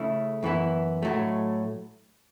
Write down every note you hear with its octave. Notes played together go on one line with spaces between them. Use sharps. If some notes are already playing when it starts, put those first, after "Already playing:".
Already playing: C#3 A3 E4
F#2 E3 B3 E4
A2 F#3 A3